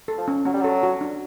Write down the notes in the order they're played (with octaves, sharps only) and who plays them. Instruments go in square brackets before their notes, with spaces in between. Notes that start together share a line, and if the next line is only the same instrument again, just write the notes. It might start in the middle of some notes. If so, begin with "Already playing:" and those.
[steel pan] A4
[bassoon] F3
[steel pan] C#4
[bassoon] F#3 [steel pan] C#4
[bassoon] G3
[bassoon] F#3 [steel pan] A4
[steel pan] F#4
D4